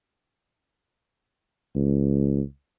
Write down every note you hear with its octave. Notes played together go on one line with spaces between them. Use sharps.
C#2